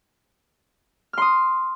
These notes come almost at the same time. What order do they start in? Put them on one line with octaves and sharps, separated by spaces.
F6 C6 D#6